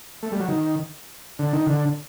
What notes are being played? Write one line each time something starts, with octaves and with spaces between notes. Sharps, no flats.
A3
G3
F#3
D#3
D3
D#3
D3